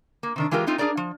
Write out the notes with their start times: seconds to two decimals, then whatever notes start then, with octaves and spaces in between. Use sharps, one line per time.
0.23 A#3
0.36 C3 D#3 D4
0.51 E3 G#3 F4 G4 A#4
0.67 A3 C4 D#4 F4
0.78 D4 G#4 A#4 D5 A#5
0.97 F3